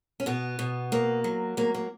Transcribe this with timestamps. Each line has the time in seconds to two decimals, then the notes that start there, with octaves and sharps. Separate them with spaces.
0.20 C#4
0.26 B2 B3
0.59 B2
0.92 A#3
1.24 F#3
1.57 F#3 A#3
1.74 A#3